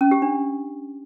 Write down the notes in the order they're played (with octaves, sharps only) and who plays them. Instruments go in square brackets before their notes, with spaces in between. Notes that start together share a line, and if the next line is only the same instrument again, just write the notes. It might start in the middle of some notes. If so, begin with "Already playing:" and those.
[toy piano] C#4
G4
D4